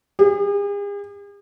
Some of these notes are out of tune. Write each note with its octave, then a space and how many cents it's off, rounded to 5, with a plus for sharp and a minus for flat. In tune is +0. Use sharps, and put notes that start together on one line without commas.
G#4 -45